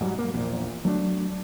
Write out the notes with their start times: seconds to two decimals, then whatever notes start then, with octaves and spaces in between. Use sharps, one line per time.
0.01 G#2 F#3 G3
0.18 A#3
0.34 A#1 E2 A#2
0.85 F#3 A3 D4